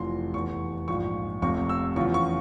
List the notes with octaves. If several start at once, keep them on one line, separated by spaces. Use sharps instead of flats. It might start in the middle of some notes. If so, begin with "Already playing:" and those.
Already playing: F1 F2 E3 C6
F1 E2 E3 C#6
A#1 G#2 F3 C#6
F1 F2 C3 F3 C#6
E6
E2 C#3 F3 C#6
C#6